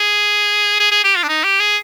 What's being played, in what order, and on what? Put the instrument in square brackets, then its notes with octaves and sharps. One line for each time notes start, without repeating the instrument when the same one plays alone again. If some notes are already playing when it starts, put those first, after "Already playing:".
Already playing: [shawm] G#4
G#4
G#4
G4
F4
D4
D#4
G4
G#4